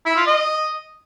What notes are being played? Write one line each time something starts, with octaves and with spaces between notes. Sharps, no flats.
E4
F4
D#5